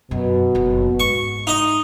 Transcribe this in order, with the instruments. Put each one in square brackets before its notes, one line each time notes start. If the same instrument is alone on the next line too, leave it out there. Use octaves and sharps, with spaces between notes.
[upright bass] F#2 [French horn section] B2
[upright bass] F#1 F#2
[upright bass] G#2 [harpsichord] C#6
[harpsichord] D#4 D#5